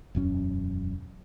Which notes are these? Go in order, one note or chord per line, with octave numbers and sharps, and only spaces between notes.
E1 F#2 C#4